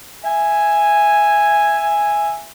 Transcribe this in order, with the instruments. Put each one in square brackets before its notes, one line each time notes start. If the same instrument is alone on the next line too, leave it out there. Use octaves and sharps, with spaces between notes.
[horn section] E5 G#5